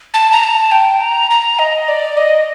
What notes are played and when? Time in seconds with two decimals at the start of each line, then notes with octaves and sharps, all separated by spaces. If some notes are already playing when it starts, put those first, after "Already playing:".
0.14 A5
0.32 A#5
0.44 A5
0.72 G5
1.00 A#5
1.31 A#5
1.59 D#5
1.88 D5
2.17 D#5